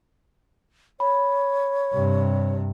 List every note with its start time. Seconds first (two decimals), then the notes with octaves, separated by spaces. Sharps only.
1.00 C#5 B5
1.93 G2 C3